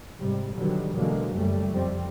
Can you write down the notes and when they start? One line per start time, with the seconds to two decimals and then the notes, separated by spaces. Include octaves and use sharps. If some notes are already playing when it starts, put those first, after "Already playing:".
0.21 G#2 C3 G3
0.57 B2 D3 D#3 F#3 G3
0.95 B2 D3 E3 F#3 G#3 A#3
1.32 F#1 F#2 G3 A3
1.70 F2 G3 C4